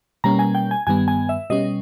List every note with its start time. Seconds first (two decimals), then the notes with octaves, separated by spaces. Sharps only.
0.24 B2 G3 A#3 C#4 A#5
0.39 G#5
0.55 G5
0.71 G#5
0.87 G2 D#3 G3 B3 G#5
1.08 G#5
1.29 E5
1.50 B2 G3 C#4 D#5